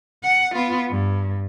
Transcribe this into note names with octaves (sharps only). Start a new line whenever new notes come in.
F#5
B3 F4
G2